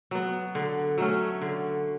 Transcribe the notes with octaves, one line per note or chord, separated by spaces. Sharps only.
F#3 B3
D3
F#3 A3 C#4
D3